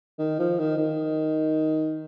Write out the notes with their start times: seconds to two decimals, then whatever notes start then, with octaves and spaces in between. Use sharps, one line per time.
0.19 D#3
0.39 F3
0.59 D#3
0.78 D#3